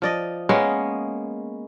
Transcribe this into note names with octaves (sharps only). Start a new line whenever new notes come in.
F3 D5 D#5
G#3 A#3 B3 C#4